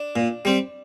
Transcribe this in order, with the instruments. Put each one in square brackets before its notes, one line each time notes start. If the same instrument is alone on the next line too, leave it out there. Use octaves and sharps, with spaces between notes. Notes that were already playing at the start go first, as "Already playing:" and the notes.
Already playing: [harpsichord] D4
A#2
G3 C4